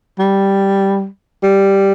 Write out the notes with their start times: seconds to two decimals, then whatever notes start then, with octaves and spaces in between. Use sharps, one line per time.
0.19 G3
1.43 G3